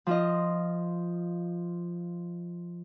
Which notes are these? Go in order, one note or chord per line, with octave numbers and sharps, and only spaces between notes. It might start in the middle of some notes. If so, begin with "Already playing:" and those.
F3 F4 D#5